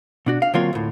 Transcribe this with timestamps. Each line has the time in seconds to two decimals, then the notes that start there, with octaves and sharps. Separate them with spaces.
0.26 B2 D4 F#4
0.42 F5
0.54 D3 F#3 A#3 C4 F4 C#5
0.73 D2 A2